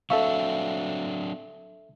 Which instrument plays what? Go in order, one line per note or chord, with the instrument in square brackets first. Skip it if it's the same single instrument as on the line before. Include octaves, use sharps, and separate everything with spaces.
[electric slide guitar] F#3 C4 D4 [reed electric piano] A4 E5 C#6 [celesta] F5